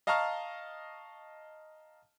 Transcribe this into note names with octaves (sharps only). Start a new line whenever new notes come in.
D#5 F5 A5 A#5 C#6 F6